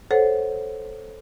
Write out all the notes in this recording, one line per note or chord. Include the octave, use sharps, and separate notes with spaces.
A4 C5 C#5 F#5